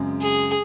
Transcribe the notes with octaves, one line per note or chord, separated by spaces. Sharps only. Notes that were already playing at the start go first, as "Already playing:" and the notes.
Already playing: F#2 C#3 G#3 C4
G#4